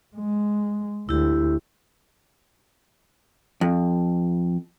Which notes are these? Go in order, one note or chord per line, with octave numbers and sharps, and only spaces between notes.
G#3
D2 E4 G4
F2